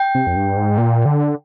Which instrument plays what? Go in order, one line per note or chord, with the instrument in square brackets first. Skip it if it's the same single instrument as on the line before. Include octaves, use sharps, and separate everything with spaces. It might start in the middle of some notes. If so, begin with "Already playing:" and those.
Already playing: [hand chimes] G5
[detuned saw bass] C3
F2
G2
G#2
A#2
D3